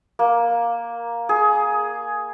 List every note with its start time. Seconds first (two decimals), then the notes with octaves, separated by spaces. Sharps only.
0.19 A#3
1.29 G#4